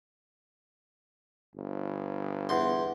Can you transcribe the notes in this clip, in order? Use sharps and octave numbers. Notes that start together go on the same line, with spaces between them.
G1
E2 C6